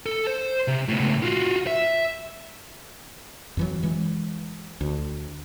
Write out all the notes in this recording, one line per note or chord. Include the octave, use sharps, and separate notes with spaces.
A4
C5
C3
C#2 A2
F4 F#4
E5
F2 E3 F#3
E3 G#3
D2